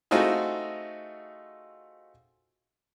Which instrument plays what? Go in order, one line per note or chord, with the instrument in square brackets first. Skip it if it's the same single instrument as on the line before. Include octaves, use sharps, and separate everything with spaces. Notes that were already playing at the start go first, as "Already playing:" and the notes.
[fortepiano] A3 C4 D#4 F4 F#4 G#4